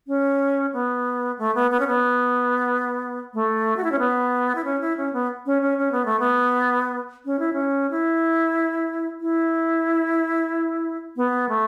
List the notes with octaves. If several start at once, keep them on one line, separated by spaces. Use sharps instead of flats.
C#4
B3
A3
B3
B3
C#4
B3
A3
F#4
E4
C#4
B3
E4
C#4
E4
C#4
B3
C#4
C#4
C#4
B3
A3
B3
C#4
E4
C#4
E4
E4
B3
A3